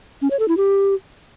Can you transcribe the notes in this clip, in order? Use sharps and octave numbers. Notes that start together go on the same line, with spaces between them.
C#4
C#5
A4
E4
G4